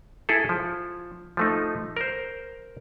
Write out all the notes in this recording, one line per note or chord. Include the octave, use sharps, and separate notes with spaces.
E4 G#4 A4
F3
F3 A3 D#4
A#4 C5